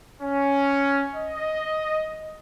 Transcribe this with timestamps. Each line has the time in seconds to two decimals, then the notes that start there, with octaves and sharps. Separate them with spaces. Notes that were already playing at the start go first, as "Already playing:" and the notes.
0.22 C#4
1.15 D#5